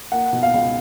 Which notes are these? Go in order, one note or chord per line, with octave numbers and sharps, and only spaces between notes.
A#3 F#5
B2
F5
C#2